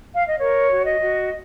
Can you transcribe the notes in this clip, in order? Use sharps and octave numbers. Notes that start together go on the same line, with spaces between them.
F5
D#5
A#4 C#5
F#4
D#5
F#4